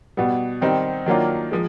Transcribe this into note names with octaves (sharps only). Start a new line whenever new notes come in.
B2 G3 B3
D#3 G3 C4 D#4
D#3 F#3 A#3 D4 F4
F3 G#3